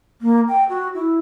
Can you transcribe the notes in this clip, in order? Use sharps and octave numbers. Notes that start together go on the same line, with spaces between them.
A#3
G5
F#4
E4